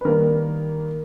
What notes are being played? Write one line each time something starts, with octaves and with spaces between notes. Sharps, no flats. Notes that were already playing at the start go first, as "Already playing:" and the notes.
B4
D#3 G3 A#3 A#4